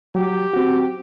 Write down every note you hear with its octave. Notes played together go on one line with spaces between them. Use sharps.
F#3 G4
C4 F#4